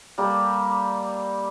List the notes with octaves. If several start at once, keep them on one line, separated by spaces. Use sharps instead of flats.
G3 A#3 G4 A4